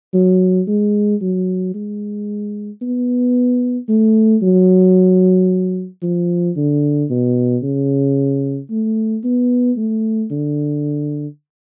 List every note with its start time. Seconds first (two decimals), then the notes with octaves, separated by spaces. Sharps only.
0.14 F#3
0.67 G#3
1.21 F#3
1.74 G#3
2.82 B3
3.89 A3
4.42 F#3
6.02 F3
6.56 D3
7.10 B2
7.63 C#3
8.70 A3
9.24 B3
9.77 A3
10.31 D3